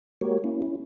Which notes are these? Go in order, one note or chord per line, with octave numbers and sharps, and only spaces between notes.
G#3 A#3 F#4 G4 A#4 C#5
A#3 C#4 E4
C#4 E4